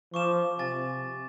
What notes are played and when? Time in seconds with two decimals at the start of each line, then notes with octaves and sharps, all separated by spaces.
0.14 F3 C#6 D6 E7
0.59 C3 G#5 A6